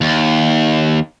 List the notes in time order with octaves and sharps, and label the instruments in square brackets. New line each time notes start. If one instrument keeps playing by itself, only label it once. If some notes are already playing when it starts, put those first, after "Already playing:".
[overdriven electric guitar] D#2